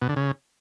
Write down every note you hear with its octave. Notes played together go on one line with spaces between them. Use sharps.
B2
D3
C#3